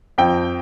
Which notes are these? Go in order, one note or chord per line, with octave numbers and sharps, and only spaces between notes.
F2 G5